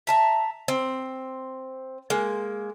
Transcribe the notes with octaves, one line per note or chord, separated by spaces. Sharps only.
E5 A5 A#5
C4
G#3 A#3